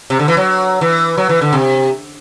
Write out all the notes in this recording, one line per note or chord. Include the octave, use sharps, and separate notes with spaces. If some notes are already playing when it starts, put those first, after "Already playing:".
C3
D3
E3
F#3
E3
F#3
E3
D3
C3